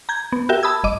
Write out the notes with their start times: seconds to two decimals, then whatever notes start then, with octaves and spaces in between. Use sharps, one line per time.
0.09 A#5 G6 G#6
0.32 B3
0.49 F#4 G4 A#4 E5 G5
0.63 A5 B5 D#6 E6 G#6
0.84 G1 D#5 D6